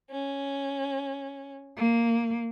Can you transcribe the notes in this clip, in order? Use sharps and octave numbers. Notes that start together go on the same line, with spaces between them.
C#4
A#3